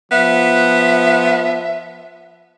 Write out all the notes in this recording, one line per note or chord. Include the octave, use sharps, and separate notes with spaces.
F3 B3 E5